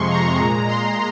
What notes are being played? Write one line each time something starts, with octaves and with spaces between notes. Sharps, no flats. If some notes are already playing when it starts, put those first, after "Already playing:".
Already playing: F2 C3 F3 G#3 C6 C#6
A#5
A#2 G#3
C6